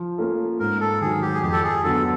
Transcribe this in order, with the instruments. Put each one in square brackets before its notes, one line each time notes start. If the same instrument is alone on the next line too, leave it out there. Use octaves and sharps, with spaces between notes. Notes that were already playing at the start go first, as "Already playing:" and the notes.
Already playing: [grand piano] F3
A#3 C#4 F4 A4
[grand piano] G#2 [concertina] A#4
[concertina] A4
[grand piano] D#3 F#3 [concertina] G#4
[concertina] G4
G#4
[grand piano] F2 [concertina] G4
[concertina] A4
G#4
[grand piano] D3 F#3 B3 [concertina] A4